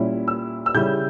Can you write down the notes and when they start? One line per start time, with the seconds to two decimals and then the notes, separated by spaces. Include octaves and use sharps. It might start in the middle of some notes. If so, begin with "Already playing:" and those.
Already playing: A#2 G3 C#4 E4
0.28 E6
0.66 E6
0.75 C#3 G3 C#4 E4 G6